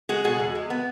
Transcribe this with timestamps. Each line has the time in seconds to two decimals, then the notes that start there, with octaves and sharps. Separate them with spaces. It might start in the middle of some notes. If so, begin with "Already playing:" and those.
0.09 G#3 F#4 G#4
0.24 B2 F#4 G#4
0.39 E2
0.55 G#3
0.70 B3